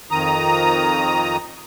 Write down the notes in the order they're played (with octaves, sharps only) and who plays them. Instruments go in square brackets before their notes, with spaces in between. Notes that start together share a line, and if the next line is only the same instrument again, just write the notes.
[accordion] F2 D#3 A#5 D#6